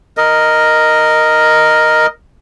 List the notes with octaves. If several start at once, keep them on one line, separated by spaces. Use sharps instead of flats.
A#4 D#5